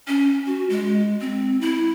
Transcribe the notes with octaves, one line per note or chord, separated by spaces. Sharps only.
C#4
F#4
G#3
C4
E4